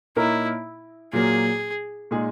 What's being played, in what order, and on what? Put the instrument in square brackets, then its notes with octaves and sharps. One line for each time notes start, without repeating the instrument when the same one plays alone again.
[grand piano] A#2 A#3 D#4 A#4 C#5 [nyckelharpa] E4
[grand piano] A#2 F#3 A#3 [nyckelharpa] G#4
[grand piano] A#2 G#3 D#4 G#4